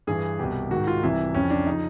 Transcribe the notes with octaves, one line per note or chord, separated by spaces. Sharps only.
G2 E3 G#4
C2 B2 G4
G#2 D#3 F#4
F4
C2 C3 E3 E4
F2 C#3 F3 C#4
D4
C#3 F3 D#4